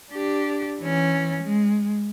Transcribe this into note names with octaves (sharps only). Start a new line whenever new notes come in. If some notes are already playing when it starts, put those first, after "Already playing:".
D4 G4
E3 C#4
G#3